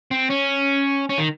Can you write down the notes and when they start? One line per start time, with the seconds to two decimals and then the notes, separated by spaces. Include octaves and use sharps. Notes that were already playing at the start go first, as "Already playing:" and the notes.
0.11 C4
0.30 C#4
1.09 C#4
1.18 D#3